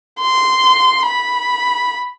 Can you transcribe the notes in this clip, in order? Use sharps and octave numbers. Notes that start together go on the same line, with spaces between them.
C6
B5